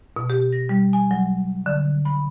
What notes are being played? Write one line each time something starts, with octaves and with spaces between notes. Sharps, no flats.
B2
G4
A#6
G3
G#5
F#3
D3
B5